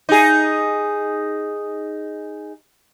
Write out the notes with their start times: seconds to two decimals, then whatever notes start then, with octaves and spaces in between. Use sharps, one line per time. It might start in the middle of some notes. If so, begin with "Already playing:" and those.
0.09 D#4 G#4